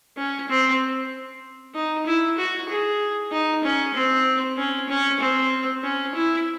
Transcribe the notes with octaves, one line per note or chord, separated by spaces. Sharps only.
C#4
C4
D#4
E4
F#4
G#4
D#4
C#4
C4
C#4
C#4
C4
C#4
E4